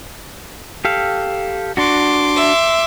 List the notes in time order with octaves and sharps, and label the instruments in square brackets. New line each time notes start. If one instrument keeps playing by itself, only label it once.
[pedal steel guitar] G4 A4 F5
[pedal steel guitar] D4 F#4 [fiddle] C6 D6
[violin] E5